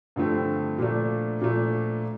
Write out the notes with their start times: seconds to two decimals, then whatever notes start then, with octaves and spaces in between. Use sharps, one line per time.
0.16 G2 D3 F3 A3 C4
0.79 A#2 F3 A3 D4
1.41 A#2 F3 A3 D4